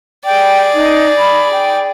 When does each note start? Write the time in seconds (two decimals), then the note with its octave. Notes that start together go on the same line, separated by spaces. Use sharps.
0.25 G#4 D5 G5
0.74 D#4
1.18 B5
1.52 G5